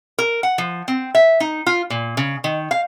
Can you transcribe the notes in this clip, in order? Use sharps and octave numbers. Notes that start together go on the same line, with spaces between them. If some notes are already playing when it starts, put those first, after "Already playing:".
A#4
F#5
F3
C4
E5
D#4
F4
A#2
C#3
D#3
F5